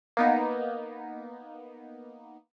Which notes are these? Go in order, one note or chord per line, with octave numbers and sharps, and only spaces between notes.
A#3 B3 D#4